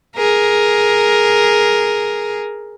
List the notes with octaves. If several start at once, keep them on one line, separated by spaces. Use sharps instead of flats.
G#4 A#4